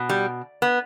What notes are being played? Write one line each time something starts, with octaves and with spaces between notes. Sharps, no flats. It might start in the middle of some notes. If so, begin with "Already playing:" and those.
Already playing: B2
G3
B3